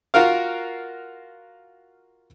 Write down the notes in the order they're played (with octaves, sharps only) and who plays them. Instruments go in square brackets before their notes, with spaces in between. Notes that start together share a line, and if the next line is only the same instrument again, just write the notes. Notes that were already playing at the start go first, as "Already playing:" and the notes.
[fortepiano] F4 F#4 A#4 F5